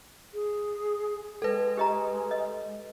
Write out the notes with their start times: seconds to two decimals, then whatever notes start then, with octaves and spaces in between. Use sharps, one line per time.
0.34 G#4
1.42 G#3 A4 B4
1.77 G4 D#5 A#5
2.31 D#5